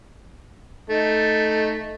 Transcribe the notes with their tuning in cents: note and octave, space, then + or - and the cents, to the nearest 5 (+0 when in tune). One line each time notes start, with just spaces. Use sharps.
A3 +0 D#4 +0